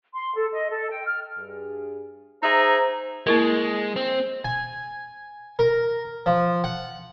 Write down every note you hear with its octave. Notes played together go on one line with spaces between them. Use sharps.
C6
A4
D#5
A4
G5
F6
G2 G#4
D#4 G#4 C5 E5 A#5
G#3 A#3 E4 A#4
C4
G#5
A#4
F3
F#5